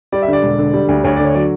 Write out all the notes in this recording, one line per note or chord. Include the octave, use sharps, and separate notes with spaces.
G3 D5
E5
D3
D5
E1
D3
G3
D2
D2 C#5
D3 D5
C#5
F#3 D5